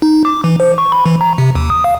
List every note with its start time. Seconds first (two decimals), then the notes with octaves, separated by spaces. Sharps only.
0.02 D#4
0.25 D6
0.44 E3
0.60 C5
0.78 C#6
0.92 B5
1.06 E3
1.21 A#5
1.38 C3
1.55 D#2
1.70 D#6
1.84 F5